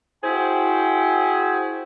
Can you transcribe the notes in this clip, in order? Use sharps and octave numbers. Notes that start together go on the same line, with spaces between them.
E4 F#4 G#4 C5 G5